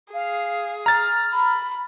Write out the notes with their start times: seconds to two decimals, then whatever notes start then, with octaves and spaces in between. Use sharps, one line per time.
0.14 G#4 F5
0.86 A#5 F6 A6
1.34 B5